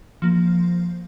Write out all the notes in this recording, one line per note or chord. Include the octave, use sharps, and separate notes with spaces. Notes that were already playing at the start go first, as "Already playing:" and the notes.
F3 A#3